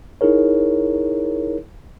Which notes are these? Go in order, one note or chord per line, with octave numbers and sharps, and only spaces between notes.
D#4 E4 G#4 A#4 C#5